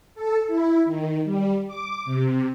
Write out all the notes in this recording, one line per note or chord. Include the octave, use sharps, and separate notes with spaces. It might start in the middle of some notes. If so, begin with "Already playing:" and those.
A4
E4
D#3
G3
D6
C3